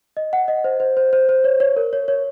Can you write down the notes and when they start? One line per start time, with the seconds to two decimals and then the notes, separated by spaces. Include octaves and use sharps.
0.17 D#5
0.33 F#5
0.48 D#5
0.64 C5
0.80 C5
0.97 C5
1.13 C5
1.29 C5
1.44 C#5
1.60 C#5
1.76 A#4
1.93 C#5
2.08 C#5